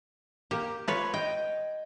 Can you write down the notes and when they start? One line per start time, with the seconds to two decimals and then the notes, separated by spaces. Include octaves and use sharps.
0.51 A#3 G4
0.88 F4 B4 C#5
1.14 D#5 G5